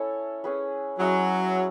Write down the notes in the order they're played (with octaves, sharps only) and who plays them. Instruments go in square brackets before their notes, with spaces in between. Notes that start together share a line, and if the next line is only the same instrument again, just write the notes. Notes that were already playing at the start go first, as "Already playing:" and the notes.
Already playing: [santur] C#4 E4 A4 C#5
C#4 G#4 B4
[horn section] F#3 [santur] C#4 E4 G#4 D#5